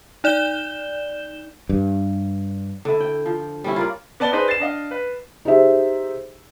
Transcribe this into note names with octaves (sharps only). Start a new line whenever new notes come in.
D#4 D5 G6 E7 G7
G2
D3 E4
G5
F3
G3 C#4 E4
F4 A#4 D5
B3 D5 A5 A6 G7
D#4 G#4 B4 C5 D5 D#5
A6 C7 E7
D4 D#5 F5
B4
D#4 G4 G#4 C5 E5